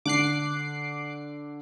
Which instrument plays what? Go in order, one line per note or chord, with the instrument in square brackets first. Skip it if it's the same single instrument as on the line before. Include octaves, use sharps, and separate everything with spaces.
[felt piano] D3 [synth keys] D6 F#6 C7